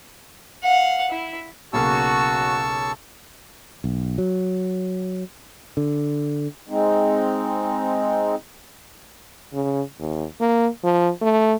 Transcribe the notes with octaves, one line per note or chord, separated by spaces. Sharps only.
F5 F#5
E4
B1 C#3 A#3 F#4 A5 C#6 E6
B1
F#3
D3
G#3 C4 D#4
C#3
D#2
A#3
F3
A3